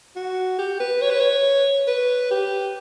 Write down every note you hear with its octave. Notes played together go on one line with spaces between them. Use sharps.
F#4
G4
B4
C#5
B4
C#5
B4
G4